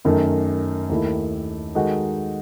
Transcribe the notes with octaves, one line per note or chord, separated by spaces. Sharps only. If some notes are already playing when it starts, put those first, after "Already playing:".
F#2 D#3 A3
D#2 D#3 A3 E4
D#3 G#3 D#4 F#4 A4